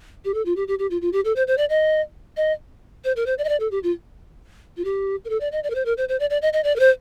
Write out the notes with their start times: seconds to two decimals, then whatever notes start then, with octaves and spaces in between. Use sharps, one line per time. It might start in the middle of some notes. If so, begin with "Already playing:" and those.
0.25 G4
0.34 A4
0.46 F4
0.56 G4
0.68 G4
0.79 G4
0.91 F4
1.02 F4
1.13 G4
1.25 A4
1.36 C5
1.47 C5
1.58 D5
1.70 D#5
2.37 D#5
3.05 C5
3.16 A#4
3.26 C5
3.38 D5
3.44 D#5
3.49 D5
3.60 A4
3.71 G4
3.83 F4
4.77 F4
4.85 G4
5.25 A#4
5.30 A4
5.41 D5
5.52 D#5
5.64 D5
5.70 A#4
5.75 C5
5.85 A#4
5.97 C5
6.09 C5
6.20 D5
6.30 D5
6.42 D#5
6.53 D#5
6.64 D5
6.76 A#4
6.80 C5